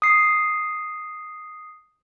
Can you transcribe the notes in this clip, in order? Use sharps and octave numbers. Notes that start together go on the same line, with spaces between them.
D#6 C7